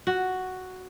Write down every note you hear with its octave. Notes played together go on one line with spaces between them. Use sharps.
F#4